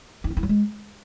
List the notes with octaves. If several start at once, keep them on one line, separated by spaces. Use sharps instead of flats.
E4
C4
E4
F#3
G#3